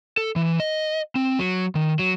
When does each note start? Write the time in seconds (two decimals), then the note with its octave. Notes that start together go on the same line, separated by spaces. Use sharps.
0.17 A4
0.36 E3
0.60 D#5
1.15 C4
1.39 F#3
1.75 D#3
1.99 F#3